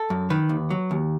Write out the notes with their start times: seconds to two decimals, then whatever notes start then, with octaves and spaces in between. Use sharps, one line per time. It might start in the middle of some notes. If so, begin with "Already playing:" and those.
Already playing: A4
0.10 F#2
0.30 D#3 B4
0.49 D#2
0.70 F#3
0.91 D#2